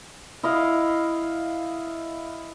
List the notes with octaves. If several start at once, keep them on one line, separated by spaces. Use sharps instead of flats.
E4 D#5 F5